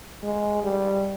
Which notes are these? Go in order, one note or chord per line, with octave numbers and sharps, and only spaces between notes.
G#3
G3